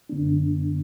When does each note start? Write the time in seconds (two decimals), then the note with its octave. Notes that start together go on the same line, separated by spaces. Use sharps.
0.09 F#2 D3 B3 D4